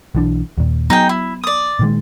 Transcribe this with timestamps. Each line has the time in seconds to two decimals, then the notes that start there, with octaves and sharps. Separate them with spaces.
0.15 B1 E3 D4
0.58 D#2 A#2
0.90 F#3 B3 D#4 G#4 G5
1.09 E4
1.43 D5 D#6
1.79 A#2 D#3 G#3